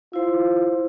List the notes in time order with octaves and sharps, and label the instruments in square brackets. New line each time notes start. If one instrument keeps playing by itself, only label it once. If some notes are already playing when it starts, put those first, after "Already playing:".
[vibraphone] E4 C5 [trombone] F4